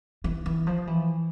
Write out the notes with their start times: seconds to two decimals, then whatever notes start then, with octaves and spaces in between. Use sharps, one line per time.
0.24 E3
0.46 E3
0.67 F3
0.87 E3